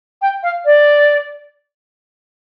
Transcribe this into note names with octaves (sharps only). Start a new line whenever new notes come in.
G5
F5
D5